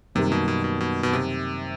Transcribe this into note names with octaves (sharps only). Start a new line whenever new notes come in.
F#2 C3 D#3 G3 A#3
B2
B2
B2
B2
B2
C3